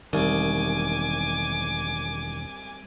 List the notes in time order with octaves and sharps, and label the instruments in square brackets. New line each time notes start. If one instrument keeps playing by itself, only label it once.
[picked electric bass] E1 D#3 [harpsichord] C2 [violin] G#5 D6